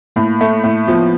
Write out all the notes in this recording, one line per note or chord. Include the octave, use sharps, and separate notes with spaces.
A2 A#3
A3
A2
F3 B3